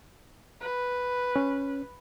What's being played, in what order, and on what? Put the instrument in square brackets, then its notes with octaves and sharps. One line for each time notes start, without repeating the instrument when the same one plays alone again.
[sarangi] B4
[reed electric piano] C#4